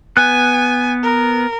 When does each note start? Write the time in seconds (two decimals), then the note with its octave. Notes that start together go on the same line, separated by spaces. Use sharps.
0.17 B3 G#5 F#6
1.03 A#4